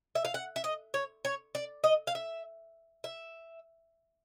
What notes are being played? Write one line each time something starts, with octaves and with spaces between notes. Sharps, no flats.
E5
F5
F#5
E5
D#5
C#5
C#5
D5
D#5
F5
E5
E5